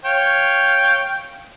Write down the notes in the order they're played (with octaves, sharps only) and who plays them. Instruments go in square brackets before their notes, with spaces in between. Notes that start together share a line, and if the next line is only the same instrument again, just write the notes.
[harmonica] C#5 F5 G5